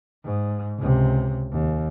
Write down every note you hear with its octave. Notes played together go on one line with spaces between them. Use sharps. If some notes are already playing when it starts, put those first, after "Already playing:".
G#2
C#2 C3
D#2